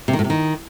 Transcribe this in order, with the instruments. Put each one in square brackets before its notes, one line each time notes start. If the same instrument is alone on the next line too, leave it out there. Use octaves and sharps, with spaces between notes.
[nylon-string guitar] C3
D#3
A2
C3
D#3